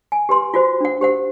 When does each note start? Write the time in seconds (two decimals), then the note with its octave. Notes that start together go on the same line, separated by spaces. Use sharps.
0.12 G#5
0.29 G4 B4 C6
0.54 F4 F#4 C5
0.81 D4 F#5
1.01 G4 C5 F#5